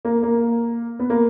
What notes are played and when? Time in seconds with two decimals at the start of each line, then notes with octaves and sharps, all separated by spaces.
0.05 A#3
0.23 A#3
0.99 B3
1.10 A#3